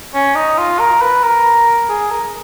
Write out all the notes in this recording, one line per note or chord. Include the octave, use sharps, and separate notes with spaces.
C#4
D#4
F4
A#4
B4
A#4
G#4
A#4